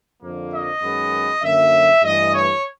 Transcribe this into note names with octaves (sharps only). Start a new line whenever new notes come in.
F2 D3 F3 A#3
D#5
F#2 D#3 G#3 B3
F#2 D3 F#3 A#3 E5
G2 E3 A3 D#5
C#5